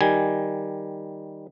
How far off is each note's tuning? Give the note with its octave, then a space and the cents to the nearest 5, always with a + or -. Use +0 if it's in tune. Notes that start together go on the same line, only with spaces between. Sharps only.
D#3 +0 G3 +0 G#5 +0